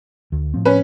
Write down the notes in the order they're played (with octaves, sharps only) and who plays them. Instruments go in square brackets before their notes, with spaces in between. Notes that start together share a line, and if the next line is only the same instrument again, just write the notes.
[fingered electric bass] D2
A2 F3 C4
[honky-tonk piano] C#4 B4